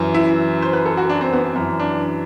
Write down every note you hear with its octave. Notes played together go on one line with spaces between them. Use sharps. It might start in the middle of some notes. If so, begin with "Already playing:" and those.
Already playing: F#2 E3
E4
C5
B4
A4
F#4
D4
C4
B3
F#2 E3
D4